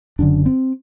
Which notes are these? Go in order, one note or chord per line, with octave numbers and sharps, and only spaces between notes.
F#1 F#2 D3 D4
C4